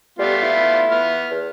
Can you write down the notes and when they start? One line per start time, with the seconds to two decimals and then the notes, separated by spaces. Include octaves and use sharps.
0.19 G3 A3 B3 F4
0.43 E4
0.91 B3 F6
1.31 E2